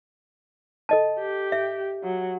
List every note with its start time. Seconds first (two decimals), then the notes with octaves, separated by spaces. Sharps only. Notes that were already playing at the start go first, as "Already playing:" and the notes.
0.89 A4 D#5 A5
1.19 G4
1.52 E5
2.03 F#3